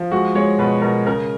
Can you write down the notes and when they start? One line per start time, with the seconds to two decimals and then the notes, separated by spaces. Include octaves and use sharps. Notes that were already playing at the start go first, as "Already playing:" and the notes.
Already playing: F3
0.12 G#3 F#4
0.35 G#3 C#5
0.59 B2 B4
0.82 B2 A#4
1.06 C#3 A#4